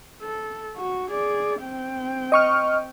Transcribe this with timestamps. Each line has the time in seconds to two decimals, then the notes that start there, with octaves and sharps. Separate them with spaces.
0.22 A4
0.77 F#4
1.11 G#4 D5
1.61 C4 G5
2.32 D#5 C#6 F6